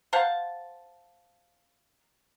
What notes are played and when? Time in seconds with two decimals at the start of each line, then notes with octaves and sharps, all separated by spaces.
0.13 C5 F5 F#5 A5